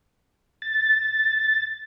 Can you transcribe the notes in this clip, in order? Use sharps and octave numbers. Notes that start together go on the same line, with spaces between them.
A6